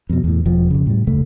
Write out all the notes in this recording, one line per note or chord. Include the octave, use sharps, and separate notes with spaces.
F2 B2
E2 A2
E1 F3
F2 C#3
A2 G3
F1 D2 C#3 A3